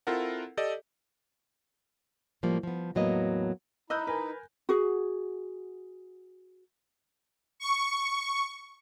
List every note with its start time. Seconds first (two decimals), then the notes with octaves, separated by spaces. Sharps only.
0.07 C4 E4 F4 A4 A#4 F#5
0.57 G4 A4 D5 D#5
2.43 A2 F3 G3 A#3
2.63 F3 B3
2.95 E2 A2 F#3 A#3 B3 D#5
3.90 D#4 E4 D#5 E6 F#6 G6
4.07 A#4 B4 G#5
4.69 F#4 G#4
7.60 C#6